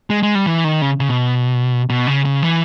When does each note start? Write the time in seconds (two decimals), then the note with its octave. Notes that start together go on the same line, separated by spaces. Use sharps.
0.10 G#3
0.23 G#3
0.35 G3
0.46 E3
0.64 D#3
0.82 C#3
1.00 C#3
1.09 B2
1.89 B2
2.07 C#3
2.25 C#3
2.43 E3